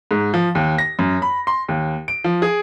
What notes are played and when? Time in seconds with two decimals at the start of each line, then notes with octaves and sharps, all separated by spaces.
0.11 G#2
0.34 F3
0.55 D#2
0.78 A#6
0.99 F#2
1.22 B5
1.47 C6
1.68 D#2
2.08 D7
2.24 F3
2.42 G#4